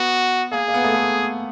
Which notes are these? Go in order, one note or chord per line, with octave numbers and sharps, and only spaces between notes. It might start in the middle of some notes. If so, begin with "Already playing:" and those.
Already playing: B3 F#4
A#3 G#4
A#3
B3
A3
A3